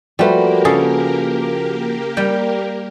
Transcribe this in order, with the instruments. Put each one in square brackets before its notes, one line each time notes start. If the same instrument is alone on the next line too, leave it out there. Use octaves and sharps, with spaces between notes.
[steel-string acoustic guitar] F3 F#4 B4 [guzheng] G3 A3 [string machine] A#3 G4 A#4
[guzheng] C#3 G#4 A4
G3 G5